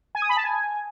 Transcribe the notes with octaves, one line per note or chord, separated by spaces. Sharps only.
G#5
D#6
B5
A5
G#5